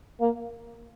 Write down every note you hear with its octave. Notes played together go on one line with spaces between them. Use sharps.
A#3